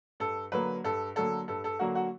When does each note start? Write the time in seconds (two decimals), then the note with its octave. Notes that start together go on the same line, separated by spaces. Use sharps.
0.20 G2 A4
0.52 D3 F#3 A#3 B4
0.84 G2 A4
1.16 D3 F#3 A#3 A4
1.48 G2 A4
1.64 A4
1.79 D3 F#3 A#3 F#4
1.95 F#4